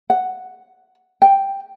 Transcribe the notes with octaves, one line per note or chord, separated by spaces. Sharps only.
F#5
G5